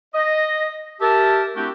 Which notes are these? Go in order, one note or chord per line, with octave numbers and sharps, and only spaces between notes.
D#5
G4 A#4 E5 A5
A3 C4 D4 E4 F#4 G4